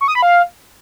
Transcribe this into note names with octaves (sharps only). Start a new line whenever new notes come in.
C#6
D#6
B5
F5